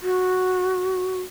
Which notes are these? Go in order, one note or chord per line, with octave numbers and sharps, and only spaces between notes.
F#4